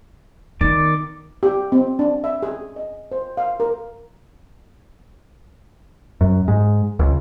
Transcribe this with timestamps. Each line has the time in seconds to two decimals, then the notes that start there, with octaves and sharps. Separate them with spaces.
0.61 D#3 B3 D#4 D5
1.43 G4
1.72 C4
1.99 D4
2.24 E5
2.43 G#4
2.76 D#5
3.12 C5
3.37 F5
3.60 A#4
6.21 F#2
6.48 G#2
6.99 C#2